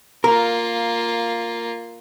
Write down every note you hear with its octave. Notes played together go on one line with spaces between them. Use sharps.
A#3 F4 A#4